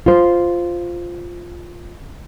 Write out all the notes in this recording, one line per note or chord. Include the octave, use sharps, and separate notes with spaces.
F4 C5